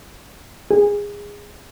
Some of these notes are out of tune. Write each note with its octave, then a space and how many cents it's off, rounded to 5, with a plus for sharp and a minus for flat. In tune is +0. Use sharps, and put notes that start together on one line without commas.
G#4 -20